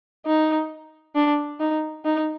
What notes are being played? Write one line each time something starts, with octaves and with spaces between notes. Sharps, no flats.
D#4
D4
D#4
D#4